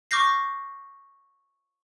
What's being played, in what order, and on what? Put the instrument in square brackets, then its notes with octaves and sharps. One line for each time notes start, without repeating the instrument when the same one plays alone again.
[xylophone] C#6 D6 F6 G6 A#6 C7